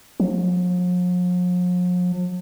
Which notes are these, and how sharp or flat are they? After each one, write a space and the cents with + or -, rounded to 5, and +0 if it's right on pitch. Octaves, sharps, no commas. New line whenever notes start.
F3 +45